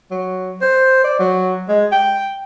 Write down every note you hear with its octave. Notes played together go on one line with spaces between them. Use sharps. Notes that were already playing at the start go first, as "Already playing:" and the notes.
F#3
C5
D5
F#3
G#3
G5